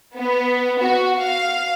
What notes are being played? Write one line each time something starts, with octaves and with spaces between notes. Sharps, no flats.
B3
F#4
F5